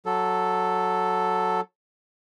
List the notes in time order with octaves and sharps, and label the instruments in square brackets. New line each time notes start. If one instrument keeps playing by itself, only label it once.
[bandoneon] F#3 A4